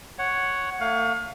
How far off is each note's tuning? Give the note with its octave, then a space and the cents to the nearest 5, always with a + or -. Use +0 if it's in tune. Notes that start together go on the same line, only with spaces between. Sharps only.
C#5 +0 F#5 +0
A3 +45 F5 +30